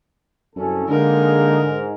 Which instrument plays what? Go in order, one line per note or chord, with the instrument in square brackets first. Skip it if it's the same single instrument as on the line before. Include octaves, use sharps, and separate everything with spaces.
[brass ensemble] C2 C#4 A4 [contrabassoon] F#2
[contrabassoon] D3 [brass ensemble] G#3 A#3 D#4 [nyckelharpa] A#4
[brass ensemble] G#2